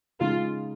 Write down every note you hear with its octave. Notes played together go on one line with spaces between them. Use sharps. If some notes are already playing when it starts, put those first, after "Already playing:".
C#3 G#3 D#4 F4